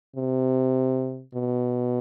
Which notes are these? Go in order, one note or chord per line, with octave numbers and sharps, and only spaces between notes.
C3
B2